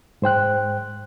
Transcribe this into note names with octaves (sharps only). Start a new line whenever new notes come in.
G#2 C5 G5 F#6